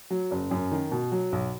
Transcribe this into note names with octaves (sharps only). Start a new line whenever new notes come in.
F#3
F#1
F#2
D#3
B2
F#3
B1